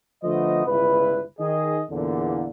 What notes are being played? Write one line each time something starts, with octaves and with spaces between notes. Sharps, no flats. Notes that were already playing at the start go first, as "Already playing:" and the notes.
D3 F3 A3 B3 C5 D#5
G1 C#2 G2 E4 B4
D#3 G#4 D#5
E2 A#2 D3